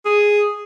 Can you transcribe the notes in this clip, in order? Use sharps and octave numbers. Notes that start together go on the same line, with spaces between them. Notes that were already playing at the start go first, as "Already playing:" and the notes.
G#4